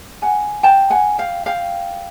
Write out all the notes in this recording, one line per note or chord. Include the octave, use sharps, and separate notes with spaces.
F#5 G#5
G5 A5
F#5 G#5
F5 G5
F5 G5